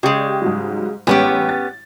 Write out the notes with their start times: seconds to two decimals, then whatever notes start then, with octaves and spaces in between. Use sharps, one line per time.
0.03 C#3 G#3 G4 D5 G5
0.42 G#2 F#3 G3
1.07 A1 G3 G#3 B3 C#4 G4
1.49 A6